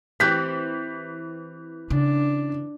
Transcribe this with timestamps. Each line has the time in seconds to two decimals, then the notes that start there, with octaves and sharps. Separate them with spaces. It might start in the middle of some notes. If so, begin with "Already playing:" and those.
0.20 E3 C4 G4 F#6 G6 B6
1.90 C#3 D4